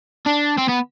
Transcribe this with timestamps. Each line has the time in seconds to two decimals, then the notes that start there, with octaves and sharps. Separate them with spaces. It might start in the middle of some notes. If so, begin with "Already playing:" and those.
0.26 D4
0.58 C4
0.68 B3